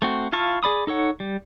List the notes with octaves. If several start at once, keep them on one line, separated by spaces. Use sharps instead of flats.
A3 C4 F#4
E4 F4 F5 A5 C#6
G#4 D5 B5 D#6
D#4 A4 C#5 F#5
G3